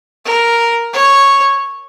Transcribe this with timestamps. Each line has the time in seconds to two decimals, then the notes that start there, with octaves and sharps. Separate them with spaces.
0.25 A#4
0.93 C#5